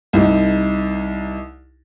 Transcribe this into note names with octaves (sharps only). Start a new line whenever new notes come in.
C2 D#4